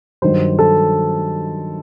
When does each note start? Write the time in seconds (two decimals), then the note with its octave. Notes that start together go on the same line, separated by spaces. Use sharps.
0.22 G2 D#3 F#3 C5
0.59 A4